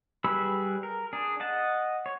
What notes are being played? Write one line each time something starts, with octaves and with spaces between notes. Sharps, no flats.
G3 G#4 B4 B5 E6
A#4
D4 G#4
D#5 F#5 A5
C#5